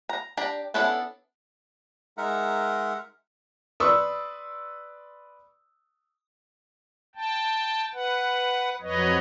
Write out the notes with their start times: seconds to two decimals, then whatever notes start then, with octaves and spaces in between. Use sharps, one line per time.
0.09 A#5
0.37 D4 G4 A#5
0.74 B3 C#4 D4 E4 A4
2.18 G#3 D#4 A#4 E5 F#5
3.80 B4 D5 C6 C#6 D#6 E6
7.15 G5 A5
7.93 B4 F#5
8.81 F2 F#3 B4 C#5 D#5